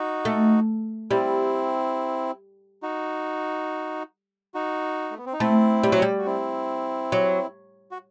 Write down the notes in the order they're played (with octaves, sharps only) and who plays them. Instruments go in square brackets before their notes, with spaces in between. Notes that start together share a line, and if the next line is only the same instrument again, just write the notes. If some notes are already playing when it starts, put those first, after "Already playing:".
Already playing: [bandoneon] D#4 F#4
[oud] A3
[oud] G3 [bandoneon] C4 E4
[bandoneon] D#4 F#4
D#4 F#4
A3
B3
C4
D#4
[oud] A3 [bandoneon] C4 E4
[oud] G3
F#3
G3
[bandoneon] F#4
C4 E4
[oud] F#3
[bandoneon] F#4